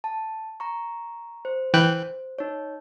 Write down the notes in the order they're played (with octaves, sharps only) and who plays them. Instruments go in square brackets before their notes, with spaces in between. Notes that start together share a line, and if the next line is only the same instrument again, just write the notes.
[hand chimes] A5
A#5 C#6
C5
[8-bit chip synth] E3 G5 F#6
[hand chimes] D#4 C#5